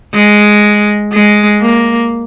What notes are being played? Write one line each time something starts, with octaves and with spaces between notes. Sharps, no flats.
G#3
G#3
A#3